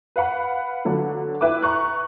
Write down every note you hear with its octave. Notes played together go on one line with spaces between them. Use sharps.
B4 F5 F#5 B5
D3 F#3 D4
E4 B4 E5 G5 D6
A#5 C#6 F#6